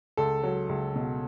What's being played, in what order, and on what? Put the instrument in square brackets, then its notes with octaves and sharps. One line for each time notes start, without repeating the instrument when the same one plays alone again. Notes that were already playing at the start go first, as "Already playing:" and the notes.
[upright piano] C#2 A4
F#3
C#2
B2